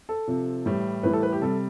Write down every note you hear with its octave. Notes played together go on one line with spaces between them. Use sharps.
A4
C3 F3
A2 E3 G3
A2 E3 G3 B4
A4
B4
G4
C3 G3 A4